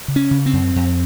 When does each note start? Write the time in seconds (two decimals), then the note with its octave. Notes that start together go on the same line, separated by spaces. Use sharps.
0.08 C#3
0.16 C#4
0.31 C#3
0.46 C4
0.53 F#2
0.76 F2